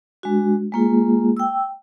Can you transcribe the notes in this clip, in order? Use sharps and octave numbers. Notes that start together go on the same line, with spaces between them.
G#3 D4 F#4
G#3 A#3 F4 G#4
G5 E6